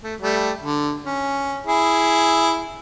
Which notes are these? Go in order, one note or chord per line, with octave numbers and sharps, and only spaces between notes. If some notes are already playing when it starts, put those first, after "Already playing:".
A3
G3 A3
D3
C#4
E4 G#4